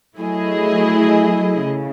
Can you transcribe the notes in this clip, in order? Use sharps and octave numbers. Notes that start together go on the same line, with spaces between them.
F#3 A3 E4 G#4 D#5
C#3